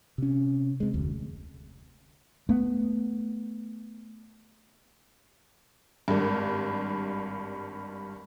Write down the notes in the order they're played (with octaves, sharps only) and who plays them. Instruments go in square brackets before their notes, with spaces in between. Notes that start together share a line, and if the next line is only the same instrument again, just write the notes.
[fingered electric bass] C3 C#4
C3 G#3
F1 D2
[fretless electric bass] A3 B3
[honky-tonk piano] G#1 G2